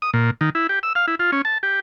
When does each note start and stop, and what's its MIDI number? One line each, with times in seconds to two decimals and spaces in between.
0.02 0.11 87
0.14 0.31 46
0.41 0.50 51
0.55 0.67 64
0.69 0.79 67
0.83 0.93 88
0.95 1.06 77
1.08 1.15 64
1.19 1.31 65
1.32 1.42 61
1.45 1.58 81
1.63 1.80 67